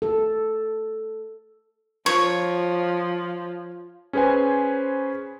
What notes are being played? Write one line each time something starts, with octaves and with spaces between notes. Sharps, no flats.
A4
F3 C#5
C#4 G#4 B4 C5 G#5